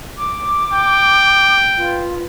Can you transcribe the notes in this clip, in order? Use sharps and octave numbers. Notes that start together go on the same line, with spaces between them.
D6
G5
F4 B4